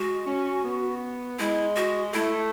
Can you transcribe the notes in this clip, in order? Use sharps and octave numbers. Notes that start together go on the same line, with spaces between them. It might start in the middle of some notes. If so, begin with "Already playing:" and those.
Already playing: G#3 F#4
C#4
B3
G#3 E4
F#4
A3 E4